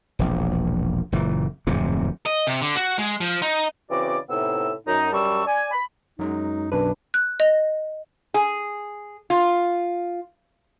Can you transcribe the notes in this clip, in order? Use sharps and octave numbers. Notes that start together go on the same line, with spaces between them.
E1 A#1
F#1 A#2 E3
D1 F2 G#2 C3
D#5
C3
D3
F#4
G#3
F3
D#4
C#3 E3 C4 F#4 D5 D6
A2 C3 B3 D#4 E6
F#2 D#4
F#2 G3 A#4 A5 C#6 E6
D5 G#5
B5
F#2 F#3 G#3 D#4
B1 F#2 D4 B4
F#6
D#5
G#4
F4